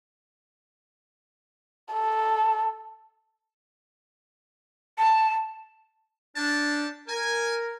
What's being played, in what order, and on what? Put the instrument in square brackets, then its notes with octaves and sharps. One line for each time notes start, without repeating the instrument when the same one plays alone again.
[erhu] A4
[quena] A5
[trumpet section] C#4 G5 A5 [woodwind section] D4
[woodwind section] A#4 [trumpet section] G#5